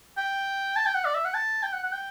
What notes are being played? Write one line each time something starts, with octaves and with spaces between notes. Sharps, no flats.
G5
A5
G5
F#5
D5
E5
F#5
A5
G5
F#5
F#5
G5